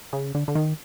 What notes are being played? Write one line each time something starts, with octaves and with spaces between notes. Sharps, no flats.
C#3
D3
D3
D#3